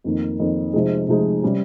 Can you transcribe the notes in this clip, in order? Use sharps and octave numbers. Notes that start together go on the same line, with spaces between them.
F2 D#3 A#3
F2 D#3 A#3
C3 F3 G#3 D#4 G#4
C3 F3 G#3 D#4 G#4
C3 G3 C#4